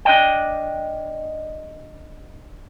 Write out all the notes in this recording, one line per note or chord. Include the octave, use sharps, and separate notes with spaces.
D4 D#5 G5